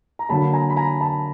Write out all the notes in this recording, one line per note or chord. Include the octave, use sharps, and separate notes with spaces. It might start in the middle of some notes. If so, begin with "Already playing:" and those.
A#5
D3 F#3 A#3 A5 B5
G#5 A#5
B5
G#5 A#5
A5 B5